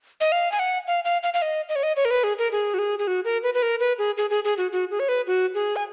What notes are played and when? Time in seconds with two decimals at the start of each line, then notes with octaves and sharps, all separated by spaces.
0.21 D#5
0.32 F5
0.52 G#5
0.59 F#5
0.87 F5
1.05 F5
1.23 F5
1.34 F5
1.42 D#5
1.69 D#5
1.76 C#5
1.83 D#5
1.96 C#5
2.05 A#4
2.11 B4
2.24 G#4
2.39 A#4
2.52 G#4
2.74 F#4
2.79 G#4
2.99 G#4
3.07 F#4
3.25 A#4
3.43 B4
3.54 B4
3.62 A#4
3.80 B4
3.99 G#4
4.18 G#4
4.30 G#4
4.44 G#4
4.58 F#4
4.72 F#4
4.91 G#4
5.00 C#5
5.09 B4
5.27 F#4
5.55 G#4
5.76 G#5